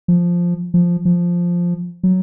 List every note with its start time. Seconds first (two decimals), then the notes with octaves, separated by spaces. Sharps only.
0.08 F3
0.74 F3
1.05 F3
2.03 F#3